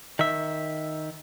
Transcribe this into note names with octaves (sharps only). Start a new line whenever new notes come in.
D#3 E5